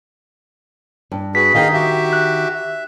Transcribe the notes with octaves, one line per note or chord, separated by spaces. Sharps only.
G2
F#4 G#4 B4 B6
D#3 G#4 D#5 F5 G5
F#4 G4 E5
F#6
E5